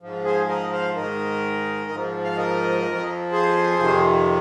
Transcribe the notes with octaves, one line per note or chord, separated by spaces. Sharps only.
G#2 F3
G#4 C5
A#4 D#5
C5 F5
G#2 D#3 A#4 D#5
G#2 F3
F5
A#4 D#5
F2 F3
G#4 C5
F2 C3 D#3